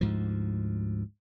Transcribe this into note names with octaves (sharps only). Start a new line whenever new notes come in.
D2 G#2 F3